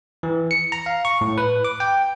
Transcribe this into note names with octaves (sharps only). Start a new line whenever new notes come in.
E3
C#7
A#5
F5
C#6
A2
B4
D6
G5